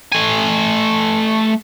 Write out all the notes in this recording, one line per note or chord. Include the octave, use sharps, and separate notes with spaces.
A3 G#5